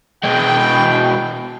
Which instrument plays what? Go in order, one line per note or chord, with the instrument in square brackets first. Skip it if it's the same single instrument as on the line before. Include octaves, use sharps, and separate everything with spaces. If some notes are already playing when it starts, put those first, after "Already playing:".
[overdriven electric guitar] B2 G#3 [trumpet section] G5